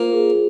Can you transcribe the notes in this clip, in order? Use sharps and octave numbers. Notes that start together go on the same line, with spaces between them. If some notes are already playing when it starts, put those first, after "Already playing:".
Already playing: A#3 F4 C5
G#4